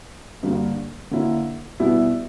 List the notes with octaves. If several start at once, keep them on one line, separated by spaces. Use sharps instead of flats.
G2 D3 G3 A#3
D3 A#3 C#4 E4
B2 G3 B3 E4